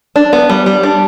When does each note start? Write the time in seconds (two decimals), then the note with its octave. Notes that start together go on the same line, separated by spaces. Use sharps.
0.16 D4
0.33 B3
0.50 G3
0.66 G3
0.83 D4